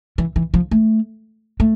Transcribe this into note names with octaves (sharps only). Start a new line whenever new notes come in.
E3
E3
F3
A3
A3